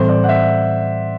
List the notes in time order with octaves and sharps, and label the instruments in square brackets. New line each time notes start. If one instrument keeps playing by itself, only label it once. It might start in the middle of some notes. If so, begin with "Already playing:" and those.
Already playing: [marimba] A2 E3 G3 C4 [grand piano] C5
[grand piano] D5
F#5
E5